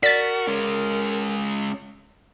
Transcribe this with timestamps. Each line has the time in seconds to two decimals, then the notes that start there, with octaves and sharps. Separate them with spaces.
0.03 F#4 A#4 D5 A6 B6
0.47 G#3 C#4